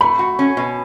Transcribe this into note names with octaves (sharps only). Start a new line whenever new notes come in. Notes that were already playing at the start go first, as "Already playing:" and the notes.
A3 B5
F#4
C#4
B2